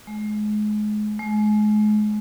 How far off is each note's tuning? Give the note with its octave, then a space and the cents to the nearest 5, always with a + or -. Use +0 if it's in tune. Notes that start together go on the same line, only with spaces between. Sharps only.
G#3 +30
G#3 +35